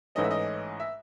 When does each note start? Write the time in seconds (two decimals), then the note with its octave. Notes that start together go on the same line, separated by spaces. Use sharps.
0.15 A1 G#2 E3 A3 C#4 D#5
0.24 E5
0.31 D#5
0.80 E5